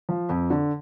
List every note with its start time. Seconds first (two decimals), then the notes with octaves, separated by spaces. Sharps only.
0.09 F3
0.29 F2
0.50 D3